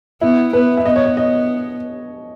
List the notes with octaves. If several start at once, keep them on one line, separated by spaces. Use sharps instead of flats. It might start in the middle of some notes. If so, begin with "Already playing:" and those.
B3 E4
B3 B4
E5
B3 D#5
C#5
C#5
D#5